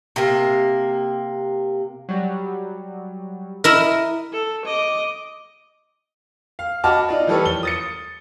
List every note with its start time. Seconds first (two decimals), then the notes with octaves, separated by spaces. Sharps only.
0.16 C3 A#3
2.09 F#3 G3
3.64 E4 A#4 D#5
4.33 A4
4.65 D#5 D6
6.59 F5
6.84 F#4 D#5 A5 B5 D6 F6
7.09 D#4 F4 D5
7.27 E3 F3 G3 A4 B4 C#5
7.46 G7
7.63 D#6 A6 C#7